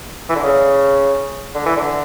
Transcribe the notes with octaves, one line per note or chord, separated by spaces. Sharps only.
E3
D3
C#3
D3
E3
D3